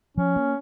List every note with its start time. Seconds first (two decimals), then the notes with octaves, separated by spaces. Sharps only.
0.17 F3 C#4
0.36 A#3